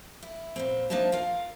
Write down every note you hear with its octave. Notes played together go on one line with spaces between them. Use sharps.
E4
A#2 B3 C4
A#3 D4 D#4 C5 E5 A5
F4 A#4 F5